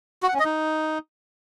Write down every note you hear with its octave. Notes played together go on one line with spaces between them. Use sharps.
F#4
F#5
C#4
D#5
D#4